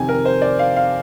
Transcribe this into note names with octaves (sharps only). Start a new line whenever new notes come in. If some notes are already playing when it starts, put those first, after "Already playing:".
Already playing: F2 C3 D#3 G#5
A#4
C5
D5
F5
F5